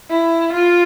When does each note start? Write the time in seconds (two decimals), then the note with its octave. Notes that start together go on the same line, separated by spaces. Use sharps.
0.10 E4
0.53 F4